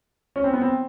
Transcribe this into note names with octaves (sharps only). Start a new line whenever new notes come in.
C#4
C4
B3
C4